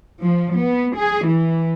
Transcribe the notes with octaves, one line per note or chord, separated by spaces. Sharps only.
F3
B3
G#4
E3